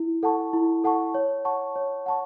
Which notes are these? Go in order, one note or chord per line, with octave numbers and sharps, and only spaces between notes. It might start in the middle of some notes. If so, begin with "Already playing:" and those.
Already playing: E4
A4 F#5 A5 C#6
E4
A4 F#5 A5 C#6
C#5
F#5 A5 C#6
C#5
F#5 A5 C#6